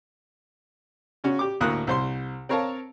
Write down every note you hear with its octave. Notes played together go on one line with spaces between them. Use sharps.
C#3 C#4 F#4
G4 D6
D2 A2 A#3 D#6 F#6
C2 C5 C6
C4 A#4 C#5 F5 A5 A#5